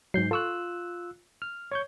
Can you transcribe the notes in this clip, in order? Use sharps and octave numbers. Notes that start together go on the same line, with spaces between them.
G#2 F#3 G6 C7
F4 A4 C#6 E6 F#6
F6
C#5 C#6 G6